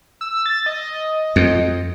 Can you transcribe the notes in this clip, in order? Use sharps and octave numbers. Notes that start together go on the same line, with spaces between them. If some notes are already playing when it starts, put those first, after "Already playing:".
E6
A6
D#5
F2